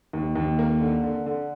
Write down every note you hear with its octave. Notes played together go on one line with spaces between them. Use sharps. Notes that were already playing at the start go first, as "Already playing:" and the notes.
D#2
D#2
A#3
D3
D3
D3